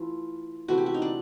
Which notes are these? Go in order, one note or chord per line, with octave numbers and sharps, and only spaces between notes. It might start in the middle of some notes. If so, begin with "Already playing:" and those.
Already playing: E3 A3 F4
C3 E3 A3 F#4
G4
F#4
D#4
D4